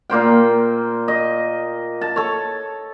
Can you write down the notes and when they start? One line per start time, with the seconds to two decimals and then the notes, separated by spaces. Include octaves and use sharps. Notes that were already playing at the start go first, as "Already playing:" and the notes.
0.10 A#2 A#3 C5 G5
1.08 D#5
2.01 A5
2.16 A4 C#5